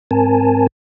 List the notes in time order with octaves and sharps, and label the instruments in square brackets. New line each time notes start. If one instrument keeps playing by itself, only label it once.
[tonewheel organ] G#2 C4 A#4 G#5 A5